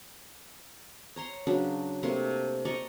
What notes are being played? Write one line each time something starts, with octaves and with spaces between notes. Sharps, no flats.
C#5 A#5 C6
C#3 F#3 D4 B4
C3 A3 A#3 C6
D5 D#5 A#5 C#6